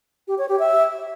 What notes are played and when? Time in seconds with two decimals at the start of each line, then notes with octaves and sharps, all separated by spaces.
0.28 G4
0.38 C#5
0.49 G4
0.59 E5